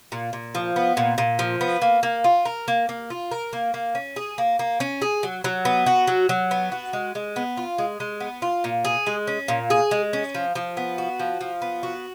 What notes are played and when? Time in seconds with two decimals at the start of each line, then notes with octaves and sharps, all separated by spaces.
0.12 A#2
0.33 A#2
0.55 F3
0.76 B3
0.97 A#2
1.18 A#2
1.39 F3
1.61 B3
1.82 A#3
2.03 A#3
2.24 F4
2.45 A#4
2.68 A#3
2.89 A#3
3.10 F4
3.31 A#4
3.53 A#3
3.74 A#3
3.95 C#4
4.16 G#4
4.38 A#3
4.59 A#3
4.80 C#4
5.02 G#4
5.23 F#3
5.44 F#3
5.65 B3
5.86 F#4
6.08 F#3
6.29 F#3
6.51 B3
6.72 F#4
6.93 G#3
7.15 G#3
7.36 B3
7.57 F4
7.78 G#3
8.00 G#3
8.20 B3
8.42 F4
8.64 A#2
8.85 G#4
9.07 G#3
9.27 C#4
9.48 A#2
9.70 G#4
9.91 G#3
10.13 C#4
10.35 F3
10.55 F3
10.77 B3
10.98 F#4
11.19 F3
11.41 F3
11.62 B3
11.83 F#4